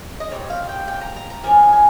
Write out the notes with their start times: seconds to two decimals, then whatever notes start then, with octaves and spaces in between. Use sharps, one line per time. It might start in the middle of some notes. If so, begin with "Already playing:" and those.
0.20 D#5
0.30 A#2 G3 C4 C#5
0.50 F5
0.69 G5
0.88 G5
1.01 A#5
1.16 A#5
1.30 A#5
1.44 F3 A#3 C#4 G#5
1.73 G#5